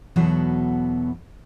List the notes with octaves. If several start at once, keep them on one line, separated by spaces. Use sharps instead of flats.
E2 B2 F#3 B3 A4 F#5